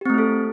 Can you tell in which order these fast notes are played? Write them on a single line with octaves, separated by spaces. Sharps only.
G4 C4 A3 E4 A4